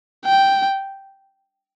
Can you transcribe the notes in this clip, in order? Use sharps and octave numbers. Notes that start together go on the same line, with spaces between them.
G5